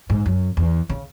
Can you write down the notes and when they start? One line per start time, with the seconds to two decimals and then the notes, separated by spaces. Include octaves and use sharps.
0.10 G#2
0.26 F#2
0.57 E2
0.89 C#3